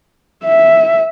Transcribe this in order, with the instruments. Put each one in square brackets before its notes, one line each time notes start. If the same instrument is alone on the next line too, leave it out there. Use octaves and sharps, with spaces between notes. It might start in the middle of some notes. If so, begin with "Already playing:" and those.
[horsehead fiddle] E5